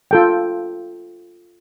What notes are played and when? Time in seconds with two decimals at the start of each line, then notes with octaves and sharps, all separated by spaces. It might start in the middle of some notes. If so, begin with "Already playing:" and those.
0.11 F4 A4 G5